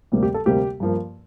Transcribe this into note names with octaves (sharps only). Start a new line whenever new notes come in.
D2 C3 G3 A#3
G4
A4
D2 C3 G3 A#3 G4
G2 F3 A#3